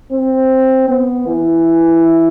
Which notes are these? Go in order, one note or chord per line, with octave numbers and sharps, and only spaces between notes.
C4
B3
E3